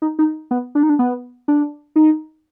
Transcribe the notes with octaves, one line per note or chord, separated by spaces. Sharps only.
D#4
D#4
B3
D4
D#4
D4
B3
D4
D#4